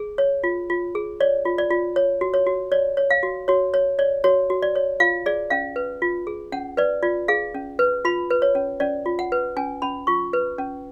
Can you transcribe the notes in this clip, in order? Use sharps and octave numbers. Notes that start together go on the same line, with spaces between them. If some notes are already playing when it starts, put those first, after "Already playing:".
Already playing: G#4
C#5
F4
F4
G#4
C#5 D5
F4
D5
F4
C#5
F#4
C#5
F#4
C#5 D5
C#5
F5
F#4
F#4 C#5
C#5
C#5 D5
F#4 C#5
F#4
D5
C#5
F4 F5
G#4 D5
C#4 F5
B4
F4
G#4
C#4 F#5
B4 D5
F4 D5
G#4 F5
C#4
B4
F4 B5
B4
C#5
C#4
C#4 D5
F4
F#5
B4
C#4 G#5
C#4 B5
F4 C#6
B4
C#4